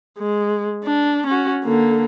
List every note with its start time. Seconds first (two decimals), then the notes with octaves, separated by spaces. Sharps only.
0.18 G#3
0.84 D4
1.27 C#4 F#4
1.64 D3 A#3